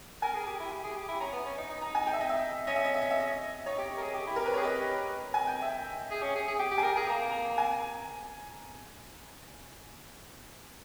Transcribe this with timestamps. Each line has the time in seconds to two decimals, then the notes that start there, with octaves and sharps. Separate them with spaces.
0.22 A#4 G#5
0.35 G#4
0.47 G4
0.60 E4
0.72 G4
0.84 G#4
0.96 G4
1.08 E4
1.20 C#4 A#5
1.33 B3
1.45 C#4
1.58 D#4
1.69 D#4
1.81 A#5
1.95 G#5
2.07 G5
2.13 E5
2.21 D#5
2.29 E5
2.67 C#4 D#5
2.76 E5
2.84 D#5
2.94 E5
3.02 D#5
3.11 E5
3.20 D#5
3.66 D#4 C#5
3.78 G4
3.97 A#4
4.02 G#4
4.14 G4
4.27 E4
4.36 G4 A#4
4.46 B4
4.54 G#4 C#5
4.64 G4 D#5
5.34 G#5
5.47 G5
5.62 E5
6.11 G#4
6.22 C#4
6.35 G#4
6.48 G#4
6.59 G4 G5
6.71 G4 G5
6.78 G#5
6.83 A#4 G5
6.96 G#4 G#5
7.08 A#3 A#5
7.30 A#5
7.58 G#5